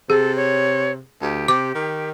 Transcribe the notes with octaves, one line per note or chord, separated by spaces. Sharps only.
C3 G#4 A4
C#5
D2 G4
C3 D6
D#3